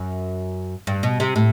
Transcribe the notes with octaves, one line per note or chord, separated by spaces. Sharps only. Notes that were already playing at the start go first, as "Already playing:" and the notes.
Already playing: F#2
G2
B2
C3
A2